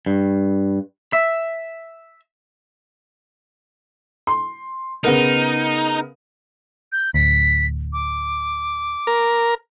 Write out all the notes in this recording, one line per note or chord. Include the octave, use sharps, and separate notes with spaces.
G2
E5
C6
C#3 B3 D#4 A#4
G6
D1 D2 B6
D6
A#4